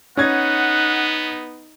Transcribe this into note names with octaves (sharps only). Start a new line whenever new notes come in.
B3 C#4 D#4 F#5 G#6